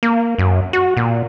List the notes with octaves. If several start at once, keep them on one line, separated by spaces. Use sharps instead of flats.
A#3
F#2
F#4
A#2